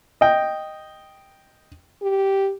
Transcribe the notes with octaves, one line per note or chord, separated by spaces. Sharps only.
D#5 G5
G4